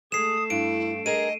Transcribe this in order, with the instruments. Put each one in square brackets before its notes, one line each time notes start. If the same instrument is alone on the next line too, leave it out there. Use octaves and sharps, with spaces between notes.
[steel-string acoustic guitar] G#3 G#4 [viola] A3 A4 [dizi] D#6 [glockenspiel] C7 E7
[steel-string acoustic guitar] G2 [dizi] E4 [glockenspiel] D7
[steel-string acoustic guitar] G#4 A#4 [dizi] D#5 [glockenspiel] D#7